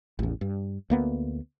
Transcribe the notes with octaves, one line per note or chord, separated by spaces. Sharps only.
A1 E2
G2
D2 A#3 B3